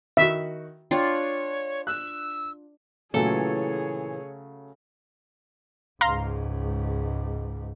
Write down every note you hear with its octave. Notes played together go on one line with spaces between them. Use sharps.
D#3 F#4 E5
D4 F4 C#5 G5
E6 F#6
A#2 C#3 E3 F#3 A3 G#4 A4 C#5
C#2 G#2 F5 A#5 C6